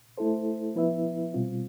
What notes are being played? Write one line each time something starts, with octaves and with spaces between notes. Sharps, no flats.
A3 E4 A4 C5
F3 B3 E4 B4 E5
B2 G3 C4 F4